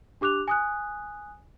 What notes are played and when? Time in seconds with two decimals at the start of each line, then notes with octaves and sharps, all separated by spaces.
0.21 D4 G4 D6 F#6 F7
0.48 G#5 D#6 F#6